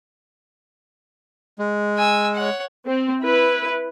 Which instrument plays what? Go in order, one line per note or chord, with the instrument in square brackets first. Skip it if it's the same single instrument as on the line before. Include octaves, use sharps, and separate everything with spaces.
[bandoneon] G#3
[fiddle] G#5 E6
C#5 F#5
[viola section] C4
E4 B4